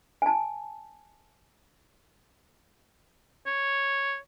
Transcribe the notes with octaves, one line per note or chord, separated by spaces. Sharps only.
G#5 A5
C#5